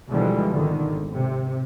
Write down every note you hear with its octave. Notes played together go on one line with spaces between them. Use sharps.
B2 D3 E3 F3 G3 G#3
G#1 D3 D#3
G#1
C3